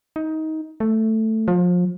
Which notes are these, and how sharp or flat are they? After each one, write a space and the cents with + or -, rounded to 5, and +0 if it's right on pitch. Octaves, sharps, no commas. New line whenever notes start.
D#4 +20
A3 +5
F3 +30